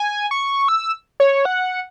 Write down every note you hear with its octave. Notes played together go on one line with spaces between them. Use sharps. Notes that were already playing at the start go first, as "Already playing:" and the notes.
Already playing: G#5
C#6
E6
C#5
F#5